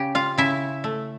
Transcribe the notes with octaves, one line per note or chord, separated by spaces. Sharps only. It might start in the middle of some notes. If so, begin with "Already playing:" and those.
Already playing: C#3 G4 G5
F4 F5
C#3 E4 E5
A3